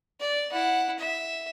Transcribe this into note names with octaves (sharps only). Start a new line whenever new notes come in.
D5
E4 F#5
E5